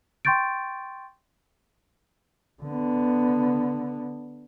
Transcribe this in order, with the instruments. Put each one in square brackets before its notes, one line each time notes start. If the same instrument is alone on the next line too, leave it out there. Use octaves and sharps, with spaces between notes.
[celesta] G5 C6 C#6 G6 A6 D7
[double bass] D3 B3